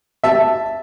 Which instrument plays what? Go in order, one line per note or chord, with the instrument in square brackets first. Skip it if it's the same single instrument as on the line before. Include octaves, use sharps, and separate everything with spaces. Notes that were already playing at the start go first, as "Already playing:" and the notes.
[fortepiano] E5 A5